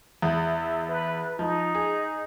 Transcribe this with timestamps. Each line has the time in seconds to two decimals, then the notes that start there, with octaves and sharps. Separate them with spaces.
0.22 E2
0.55 E5
0.88 B4
1.39 F3 D#4
1.75 G#4